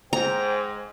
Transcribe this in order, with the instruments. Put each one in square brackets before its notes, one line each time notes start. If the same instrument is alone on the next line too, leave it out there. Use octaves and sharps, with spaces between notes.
[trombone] G#2 [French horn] C5 [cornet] G5 [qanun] A#5